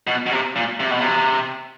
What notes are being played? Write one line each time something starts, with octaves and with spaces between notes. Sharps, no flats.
B2
B2
C3
A#2
C3
B2
C3